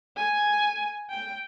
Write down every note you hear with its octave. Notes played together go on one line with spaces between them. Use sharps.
G#5
G5